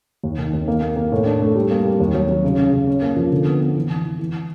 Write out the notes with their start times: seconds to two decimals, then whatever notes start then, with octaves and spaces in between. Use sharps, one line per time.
0.24 D#2
0.38 D#3
0.53 D#2
0.68 A#3
0.82 A#3
0.96 A#3
1.12 A2
1.26 D4
1.41 A3
1.56 G3
1.71 A#3
1.85 G3
2.00 D#2
2.14 F#3
2.29 F#3
2.44 C#3
2.58 C#3
2.73 C#3
2.88 C#4
3.02 A#3
3.16 F3
3.32 D3
3.47 B3
3.61 B3
3.76 E3
3.90 E3
4.05 E3
4.19 E3